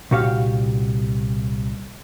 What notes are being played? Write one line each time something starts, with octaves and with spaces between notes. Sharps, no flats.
C2 A#2 F#4 G4 F5